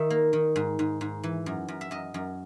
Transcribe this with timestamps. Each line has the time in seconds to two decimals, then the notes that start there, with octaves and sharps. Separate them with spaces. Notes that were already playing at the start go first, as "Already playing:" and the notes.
Already playing: D#3 E5
0.10 A#3
0.33 D#3
0.56 G#2
0.79 G#2
1.01 G#2
1.24 E3
1.46 F#2
1.68 F#2
1.81 E5
1.91 F#2 D#5
2.14 F#2